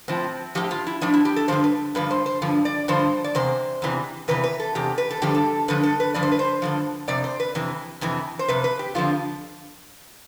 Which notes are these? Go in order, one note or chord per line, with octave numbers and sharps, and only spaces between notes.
A2 F3 C4
A2 F3 G4
F4
E4
A2 F3 D4
E4
G4
A4
G2 D3 F3 C5
B4
G2 D3 F3 B4
C5
C5
G2 D3 F3
D5
G2 D3 F3 C5
D5
E2 C3 C5
E2 C3 E3
E2 C3 E3 B4
B4
A4
E2 C3 G4
B4
A4
G2 D3 F3 G4
A4
G2 D3 F3 B4
A4
B4
G2 D3 F3 D5
C5
B4
C5
G2 D3 F3
F2 C3 D5
C5
B4
F2 C3 E3
F2 C3 E3
C5
F2 C3 B4
B4
G4
F2 D3 F3 F4